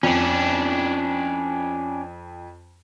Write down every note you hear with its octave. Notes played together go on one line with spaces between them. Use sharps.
F2 C#4 D4